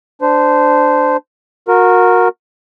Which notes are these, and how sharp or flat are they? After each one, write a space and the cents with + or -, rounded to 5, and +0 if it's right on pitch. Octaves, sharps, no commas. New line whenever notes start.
D4 +0 C5 -20
F#4 -25 A#4 +0